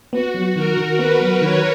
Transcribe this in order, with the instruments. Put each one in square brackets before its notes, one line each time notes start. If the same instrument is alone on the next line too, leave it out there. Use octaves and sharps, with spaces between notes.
[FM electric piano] B3 [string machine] F#4
[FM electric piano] F#3
[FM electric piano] D#3 [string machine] A#4
[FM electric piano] D#3
[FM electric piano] B3 [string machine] B4
[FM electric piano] F#3
[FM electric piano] D#3 [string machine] C#5